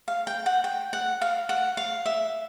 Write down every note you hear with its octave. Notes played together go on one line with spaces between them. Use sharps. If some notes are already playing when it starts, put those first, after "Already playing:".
F5
G5
F#5
G5
F#5
F5
F#5
F5
E5